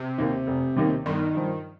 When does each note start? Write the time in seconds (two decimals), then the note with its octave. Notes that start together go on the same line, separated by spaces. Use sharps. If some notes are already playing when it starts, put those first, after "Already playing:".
Already playing: C3
0.18 D#2 D#3 A#3 D#4
0.47 F1
0.76 D#2 D#3 A#3 D#4
1.06 G1 D#3
1.35 G2 F3